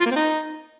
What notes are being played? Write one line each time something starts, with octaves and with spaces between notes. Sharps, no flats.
F4
A#3
C4
D#4